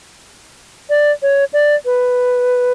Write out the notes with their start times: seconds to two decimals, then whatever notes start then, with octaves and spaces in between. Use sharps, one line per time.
0.90 D5
1.22 C#5
1.53 D5
1.85 B4